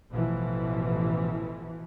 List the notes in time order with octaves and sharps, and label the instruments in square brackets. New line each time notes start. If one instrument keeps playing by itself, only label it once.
[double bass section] A1 B2 E3 F3